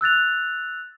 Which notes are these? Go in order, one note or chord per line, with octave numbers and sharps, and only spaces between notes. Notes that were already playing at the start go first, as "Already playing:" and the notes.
E6 F#6 A6 F7